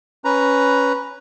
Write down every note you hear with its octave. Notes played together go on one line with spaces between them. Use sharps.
C#4 B4 A#5